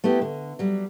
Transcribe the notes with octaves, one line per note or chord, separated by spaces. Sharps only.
A3 B3 E4 G4
D3
F#3 G3